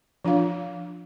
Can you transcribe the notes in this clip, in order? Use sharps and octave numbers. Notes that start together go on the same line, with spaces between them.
F3 D4 F4 F5